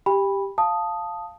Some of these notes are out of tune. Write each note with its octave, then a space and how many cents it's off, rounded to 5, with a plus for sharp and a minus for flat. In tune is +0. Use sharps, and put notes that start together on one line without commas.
G4 +5 G5 +40 B5 -5
F5 +0 A5 +0 D#6 +0